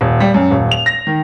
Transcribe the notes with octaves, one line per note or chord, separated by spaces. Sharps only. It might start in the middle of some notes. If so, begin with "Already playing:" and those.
D#1
G3
F#2
D#1
F7
A#6
D#3